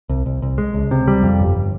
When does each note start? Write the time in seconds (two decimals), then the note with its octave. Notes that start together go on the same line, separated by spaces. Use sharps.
0.09 C2
0.26 C2
0.42 C2
0.58 G#3
0.74 C#2
0.91 C3
1.08 G3
1.23 F2
1.39 G1